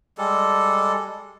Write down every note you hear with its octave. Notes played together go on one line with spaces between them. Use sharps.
G3 G#3 A4